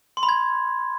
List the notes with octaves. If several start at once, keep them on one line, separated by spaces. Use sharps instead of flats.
C6
B5
G#6